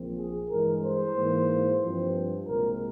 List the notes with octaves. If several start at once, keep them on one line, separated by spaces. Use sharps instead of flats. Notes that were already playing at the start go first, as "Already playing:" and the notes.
Already playing: A#1 A#2 F3 C4
G#4
G2 E3 G#3 A#4
C5
G#2 E3 A#3
G2 F3 C4
C2 A#2 G#3 C4 A#4